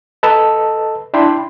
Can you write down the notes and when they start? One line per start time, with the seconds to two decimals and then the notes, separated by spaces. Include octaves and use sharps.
0.23 A4 B4 D#5 A5 E6
1.14 D4 E4 G5 B5 C6